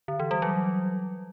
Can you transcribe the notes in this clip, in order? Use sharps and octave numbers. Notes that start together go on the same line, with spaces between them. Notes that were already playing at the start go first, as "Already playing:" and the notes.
D3
E3
G3
F#3